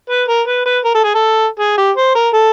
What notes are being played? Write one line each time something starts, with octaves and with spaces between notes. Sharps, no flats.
B4
A#4
B4
B4
A#4
A4
G#4
A4
G#4
G4
C5
A#4
A4